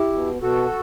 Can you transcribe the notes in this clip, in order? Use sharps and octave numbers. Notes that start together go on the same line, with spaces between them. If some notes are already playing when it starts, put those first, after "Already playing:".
Already playing: E4 G4
B2
B2 F#4 A4